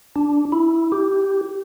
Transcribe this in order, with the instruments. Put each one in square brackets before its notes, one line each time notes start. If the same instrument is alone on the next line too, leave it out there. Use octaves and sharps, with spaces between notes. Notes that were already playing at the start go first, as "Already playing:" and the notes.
[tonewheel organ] D4
E4
G4